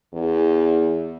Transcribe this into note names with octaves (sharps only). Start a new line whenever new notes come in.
E2